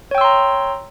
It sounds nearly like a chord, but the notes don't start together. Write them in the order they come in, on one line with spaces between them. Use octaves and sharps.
C#5 G5 E6 C6 A#5